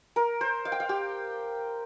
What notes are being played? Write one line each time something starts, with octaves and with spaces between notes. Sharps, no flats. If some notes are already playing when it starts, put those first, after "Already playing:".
A#4
C5
F5
G5
F5
G4